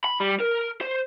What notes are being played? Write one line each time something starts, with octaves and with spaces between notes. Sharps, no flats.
B5
G3
A#4
C5